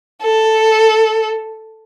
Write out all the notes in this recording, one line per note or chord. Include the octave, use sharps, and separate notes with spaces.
A4